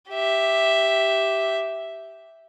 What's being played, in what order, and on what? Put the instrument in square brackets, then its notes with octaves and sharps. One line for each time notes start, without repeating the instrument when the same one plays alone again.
[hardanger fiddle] G4 E5